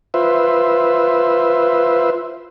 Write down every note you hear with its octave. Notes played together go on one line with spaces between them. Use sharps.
F4 B4 C5 E5